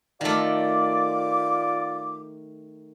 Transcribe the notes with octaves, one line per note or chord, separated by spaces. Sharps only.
D#3 A3 F4 D5 D6